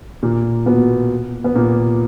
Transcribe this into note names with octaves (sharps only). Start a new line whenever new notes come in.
A#2 A#3
B2 B3
B3
A#2 A#3